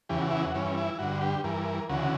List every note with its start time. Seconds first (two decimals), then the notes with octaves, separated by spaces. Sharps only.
0.09 E2 C#3 E3 G4
0.21 F#4
0.31 E4
0.41 F#4
0.54 G2 E3 C#4
0.77 E4
0.99 G2 D3 F#4
1.21 G4
1.44 G2 E3 A#4
1.89 D2 C#3 E3 F#4